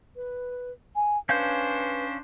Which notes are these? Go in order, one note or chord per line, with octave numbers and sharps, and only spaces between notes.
B4
G#5
C#4 D4 B4 C5 F5 G6